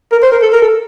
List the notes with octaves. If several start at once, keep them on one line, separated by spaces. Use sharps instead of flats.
A#4
C5
A#4
A4
A#4
A4